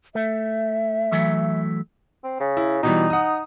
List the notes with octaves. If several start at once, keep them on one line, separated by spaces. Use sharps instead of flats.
A3 E5
E3 F#3 A3
C4
C#3
E4
B2 E3 G3 D#4
F#5 D#6